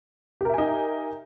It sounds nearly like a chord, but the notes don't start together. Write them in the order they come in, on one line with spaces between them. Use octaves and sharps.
G4 A#4 E5 G#5 D#4